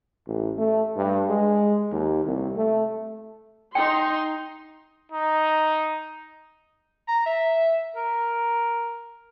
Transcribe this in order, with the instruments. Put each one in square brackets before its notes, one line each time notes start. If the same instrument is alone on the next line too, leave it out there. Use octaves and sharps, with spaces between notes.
[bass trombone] A1
A3
G2
G#3
D#2
C2
A3
[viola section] D#4 C6 [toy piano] G5
[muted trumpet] D#4
[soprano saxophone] A#5
E5
A#4